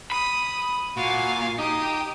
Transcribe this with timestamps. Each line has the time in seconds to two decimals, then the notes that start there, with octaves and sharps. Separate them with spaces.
0.12 B5 D#6
0.97 A#2 F#4 F5 G#5
1.58 D#4 G4 D#6